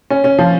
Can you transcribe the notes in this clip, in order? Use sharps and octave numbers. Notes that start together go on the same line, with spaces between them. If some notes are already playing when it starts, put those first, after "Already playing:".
C#4
C#4
F3